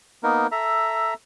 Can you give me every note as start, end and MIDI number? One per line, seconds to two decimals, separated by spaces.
0.23 0.47 58
0.23 0.47 59
0.23 0.47 63
0.23 0.47 70
0.52 1.14 69
0.52 1.14 76
0.52 1.14 82